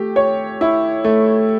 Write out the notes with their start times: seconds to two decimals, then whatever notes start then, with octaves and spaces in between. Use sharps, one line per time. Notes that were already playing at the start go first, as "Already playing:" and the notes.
Already playing: A3 G4
0.16 C#5
0.61 E4
1.04 A3